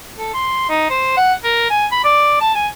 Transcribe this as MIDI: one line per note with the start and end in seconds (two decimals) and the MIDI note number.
0.18 0.31 69
0.34 0.66 84
0.69 0.89 63
0.90 1.12 72
1.17 1.33 78
1.44 1.68 70
1.70 1.86 80
1.92 2.03 83
2.04 2.38 74
2.41 2.52 81
2.55 2.67 80